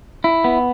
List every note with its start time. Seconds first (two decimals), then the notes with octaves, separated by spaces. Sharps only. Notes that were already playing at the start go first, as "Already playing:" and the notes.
0.24 E4
0.44 B3